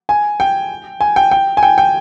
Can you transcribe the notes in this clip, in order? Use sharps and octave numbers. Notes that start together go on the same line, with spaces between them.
G#5
G5
G#5
G5
G5
G#5
G5
G5